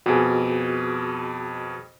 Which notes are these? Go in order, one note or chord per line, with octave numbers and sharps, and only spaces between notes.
F2 B2 F#4 G#4